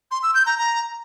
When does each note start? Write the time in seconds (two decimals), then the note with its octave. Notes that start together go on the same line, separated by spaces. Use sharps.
0.11 C6
0.23 E6
0.35 G6
0.46 A#5
0.58 A#5